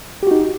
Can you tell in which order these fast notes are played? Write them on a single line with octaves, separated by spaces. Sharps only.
G4 F#4 D#4